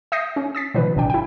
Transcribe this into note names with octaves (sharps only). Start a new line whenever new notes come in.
E5 D#6 G6 A#6 C7
C#4
D#6 A6 B6
B2 D3 E3 F#3 E4 B4
G#1 B2 D4 G5
E4 G5